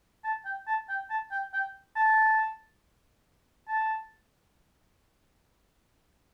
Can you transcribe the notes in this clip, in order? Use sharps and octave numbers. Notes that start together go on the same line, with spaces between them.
A5
G5
A5
G5
A5
G5
G5
A5
A5